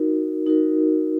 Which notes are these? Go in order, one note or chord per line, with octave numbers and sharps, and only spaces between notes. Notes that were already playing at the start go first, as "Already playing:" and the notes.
Already playing: D#4 F#4 A#4
D#4 F#4 A#4